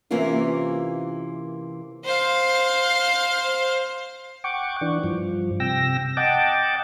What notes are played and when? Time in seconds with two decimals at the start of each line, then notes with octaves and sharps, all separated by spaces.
0.11 C3 E3 A#3 C#4 F4 A#4
2.04 C5 F5
4.44 F#5 G5 C#6 D6
4.81 E3 D4
5.04 G2 F3
5.60 C3 G5 E6 A#6
6.17 D#5 F#5 G5 A5 D6